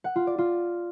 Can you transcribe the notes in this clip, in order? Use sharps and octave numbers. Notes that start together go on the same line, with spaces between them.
F#5
F4
D5
F4